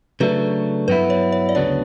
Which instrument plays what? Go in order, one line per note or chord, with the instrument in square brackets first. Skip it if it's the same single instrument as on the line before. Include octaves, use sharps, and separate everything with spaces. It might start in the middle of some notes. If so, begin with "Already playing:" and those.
[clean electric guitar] C#3 F#3 A3 D4 [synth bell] B4
[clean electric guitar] G2 F#3 B3 E4 [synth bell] B4
[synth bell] C#5
C#5
D5
[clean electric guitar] D2 C#3 F#3 B3 D4 [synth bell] C#5